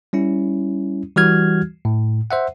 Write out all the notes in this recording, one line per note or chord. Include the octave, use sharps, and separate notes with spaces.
G3 C#4 E4
E3 G3 F#4 F6 G#6
A2
C5 E5 F#5